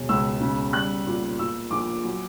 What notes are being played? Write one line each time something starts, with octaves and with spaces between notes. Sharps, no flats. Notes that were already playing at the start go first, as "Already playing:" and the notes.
Already playing: E1
C#2 E6
C#3
G3 F#6
A#2
A#2 E6
A#1 D6
F#3